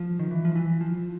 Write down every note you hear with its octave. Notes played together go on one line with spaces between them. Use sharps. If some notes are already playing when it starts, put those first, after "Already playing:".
Already playing: F3
D#3
E3
F3
E3
F3